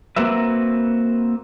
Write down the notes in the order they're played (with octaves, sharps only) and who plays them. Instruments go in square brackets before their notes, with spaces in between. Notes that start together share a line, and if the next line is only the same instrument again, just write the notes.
[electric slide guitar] A#3 C4 F#4 B4 E5